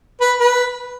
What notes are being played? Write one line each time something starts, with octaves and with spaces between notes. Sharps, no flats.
B4
B4